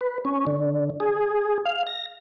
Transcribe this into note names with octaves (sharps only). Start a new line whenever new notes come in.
B4
C#4
D3
G#4
F5
A#6